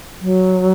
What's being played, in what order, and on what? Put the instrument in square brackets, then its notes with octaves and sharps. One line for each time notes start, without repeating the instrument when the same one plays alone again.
[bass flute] F#3